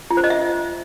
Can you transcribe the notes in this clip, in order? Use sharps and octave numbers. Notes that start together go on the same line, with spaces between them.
F4
C5
D#5
E5